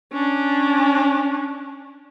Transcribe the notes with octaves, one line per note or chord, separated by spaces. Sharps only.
C#4 D4